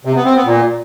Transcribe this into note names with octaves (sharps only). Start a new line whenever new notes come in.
C3
B3
C4
B3
A#2